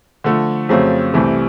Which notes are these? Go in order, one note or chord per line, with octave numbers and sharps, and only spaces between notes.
D3 F3 A3
F2 C#3 F#3 A3 C4
C2 C3 E3 A3